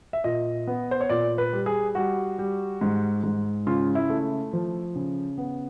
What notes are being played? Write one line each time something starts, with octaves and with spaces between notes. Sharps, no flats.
E5
A#2 D#5
B3
C5
C#5
A#2 D5
B4
G3
G#4
G3 F#4
G3
G#2
G#2
C#3 F4
E4
A3
F3
C#3
B3